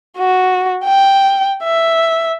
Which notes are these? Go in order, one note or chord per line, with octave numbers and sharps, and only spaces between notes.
F#4
G5
E5